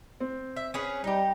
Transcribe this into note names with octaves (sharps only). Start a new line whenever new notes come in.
C4
E5
C#4 G#4 B4
G3 D#4 G4